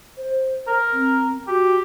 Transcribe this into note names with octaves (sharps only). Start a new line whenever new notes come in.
C5
A#4
C4
F#4 G4